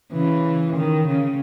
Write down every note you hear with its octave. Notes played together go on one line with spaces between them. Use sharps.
C#3 E3
D#3
C#3